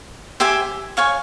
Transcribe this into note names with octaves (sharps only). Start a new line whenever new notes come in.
G4 C5 E5 G#5
C#5 F5 G#5 C#6